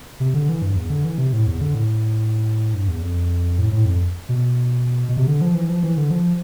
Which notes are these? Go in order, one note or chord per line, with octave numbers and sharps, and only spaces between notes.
C3
D3
E3
G2
E2
D3
E3
C3
A2
E2
D3
A2
G2
E2
F2
A2
A2
F2
B2
B2
C3
D3
F3
E3
F3
E3
D3
F3